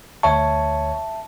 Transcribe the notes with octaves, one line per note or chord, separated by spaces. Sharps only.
D2 C#5 E5 A5 C#6